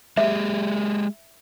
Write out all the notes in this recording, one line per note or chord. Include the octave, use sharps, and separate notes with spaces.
G#3 G4 G#4 E5